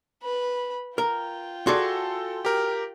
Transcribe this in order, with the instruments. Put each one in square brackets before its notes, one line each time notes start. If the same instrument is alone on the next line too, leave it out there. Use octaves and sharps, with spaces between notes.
[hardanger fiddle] B4 B5
[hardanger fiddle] F4 G5 [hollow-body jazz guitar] A#4
[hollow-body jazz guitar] F#4 G#4 D5 [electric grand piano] A4 C6
[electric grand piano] G4 A#4